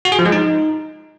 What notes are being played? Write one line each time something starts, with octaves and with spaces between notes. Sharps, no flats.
F#4
G#4
F3
G#3
D#4